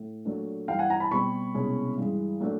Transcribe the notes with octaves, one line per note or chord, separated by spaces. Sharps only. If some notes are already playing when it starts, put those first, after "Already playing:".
Already playing: A2
A#2 F#3 A3 D4
G2 E3 G3 F5 G5
F#5 G#5
G#5 A#5
A5 B5
B2 G3 C4 B5 C#6
C2 B2 G#3 C#4
G2 E3 G#3
A#2 F#3 A3 D4